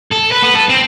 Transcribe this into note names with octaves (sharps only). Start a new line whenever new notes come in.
A4
B4
B3
A4
C4